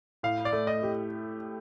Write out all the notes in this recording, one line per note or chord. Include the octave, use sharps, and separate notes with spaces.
A2 F5
D5
A3
D#5
G4